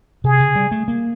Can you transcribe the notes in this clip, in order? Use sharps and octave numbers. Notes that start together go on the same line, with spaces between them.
C3 G#4
C#3
G3
A3
A#3